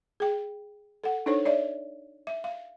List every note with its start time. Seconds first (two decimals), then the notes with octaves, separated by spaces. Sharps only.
0.20 G#4 G5
1.04 A4 F#5
1.26 D4 D#4 A4 C5 C#5
1.45 C#5 D5 E5
2.27 E5
2.44 F5